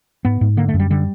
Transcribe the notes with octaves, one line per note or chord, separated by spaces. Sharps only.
G#2 B3
G#2
D3 A#3
A3
F#2
G3
D3 G3